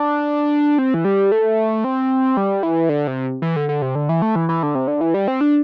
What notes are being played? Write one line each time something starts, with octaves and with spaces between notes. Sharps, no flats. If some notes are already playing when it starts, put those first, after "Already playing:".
Already playing: D4
C4
E3
G3
A3
C4
G3
E3
D3
C3
E3
D3
D3
C3
D3
E3
A3
E3
E3
D3
C3
D3
E3
G3
C4
D4